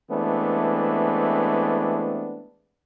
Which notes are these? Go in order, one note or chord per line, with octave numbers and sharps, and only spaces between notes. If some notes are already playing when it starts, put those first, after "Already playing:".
E3 G#3 A3 B3 C4 D4